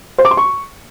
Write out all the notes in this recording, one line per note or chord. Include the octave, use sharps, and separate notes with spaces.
C5
D6
C6
C#6